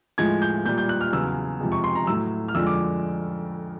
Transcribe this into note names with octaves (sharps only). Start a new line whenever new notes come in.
A2 F3 G#3 G#6
G6
A#2 G3 G6
G6
F#6
F6
E2 C#3 F#3 E6
F2 C3 F3 G#3
C#6
C6
A#5
A2 F#3 E6
F6
F2 D3 F3 G#3 E6
D6